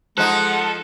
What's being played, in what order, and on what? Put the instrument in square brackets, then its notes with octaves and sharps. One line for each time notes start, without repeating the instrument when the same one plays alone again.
[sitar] F3 D#4 [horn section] G#3 F#5 [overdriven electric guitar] A4 [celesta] F#6